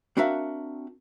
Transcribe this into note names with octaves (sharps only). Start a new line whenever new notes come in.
C4 D4 F#4 A#4 E5 F5